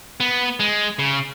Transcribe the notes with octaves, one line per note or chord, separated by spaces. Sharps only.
B3
G#3
C#3